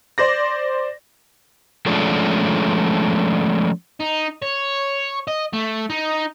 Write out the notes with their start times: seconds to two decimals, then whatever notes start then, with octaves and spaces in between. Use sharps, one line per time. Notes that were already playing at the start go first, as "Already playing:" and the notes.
0.18 C5 D5 A#6
1.86 F3 G#3 A3 C#4 D4
4.00 D#4
4.42 C#5
5.27 D#5
5.53 A3
5.90 D#4